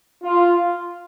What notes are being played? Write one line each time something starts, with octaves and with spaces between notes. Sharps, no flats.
F4